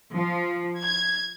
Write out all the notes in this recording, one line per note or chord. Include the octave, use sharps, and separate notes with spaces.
F3
G#6